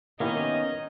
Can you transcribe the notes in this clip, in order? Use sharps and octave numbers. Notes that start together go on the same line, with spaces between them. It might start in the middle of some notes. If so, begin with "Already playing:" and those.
D#3 A#3 B3 C#4 D#4 E4 G4 D#5